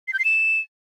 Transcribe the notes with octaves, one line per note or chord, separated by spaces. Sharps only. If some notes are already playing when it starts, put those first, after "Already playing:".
C7
G6
C7
E7